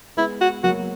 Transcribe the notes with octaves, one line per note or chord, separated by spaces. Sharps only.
G#3 B3 E4
F#4
F#3 A#3 F#4